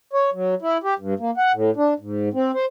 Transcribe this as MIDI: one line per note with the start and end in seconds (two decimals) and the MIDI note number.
0.13 0.30 73
0.33 0.55 54
0.62 0.77 64
0.83 0.94 67
0.99 1.14 43
1.20 1.31 58
1.37 1.52 78
1.53 1.71 45
1.76 1.94 62
1.99 2.29 44
2.34 2.51 60
2.54 2.65 72